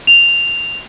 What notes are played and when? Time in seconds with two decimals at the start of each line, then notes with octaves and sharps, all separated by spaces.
0.07 F7